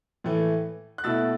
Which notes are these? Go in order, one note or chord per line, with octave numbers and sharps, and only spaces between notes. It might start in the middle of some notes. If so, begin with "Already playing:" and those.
A2 E3 A3
F#6
B2 A3 E4 E6 A6